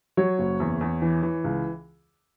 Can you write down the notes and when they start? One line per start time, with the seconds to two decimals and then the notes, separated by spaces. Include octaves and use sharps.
0.17 F#3 C#5
0.39 F#1
0.60 E2
0.81 E2
1.02 E3
1.23 E3
1.44 C#2